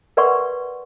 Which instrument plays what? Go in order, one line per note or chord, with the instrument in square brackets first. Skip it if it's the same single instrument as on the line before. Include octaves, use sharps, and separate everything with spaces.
[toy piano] A#4 B4 D5 F#5 C6 C#6